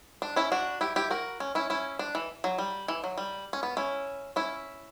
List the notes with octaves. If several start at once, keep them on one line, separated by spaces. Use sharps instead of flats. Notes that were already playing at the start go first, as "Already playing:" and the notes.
D4
C#4 E4
D4 F#4
E4 G4
E4 G4
F#4 A#4
C#4
C#4 E4
C#4 E4
D4
E3
F#3
G3
E3
F#3
G3
C#4
B3
C#4 E4
C#4 E4